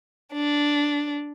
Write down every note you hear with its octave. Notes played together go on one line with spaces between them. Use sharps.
D4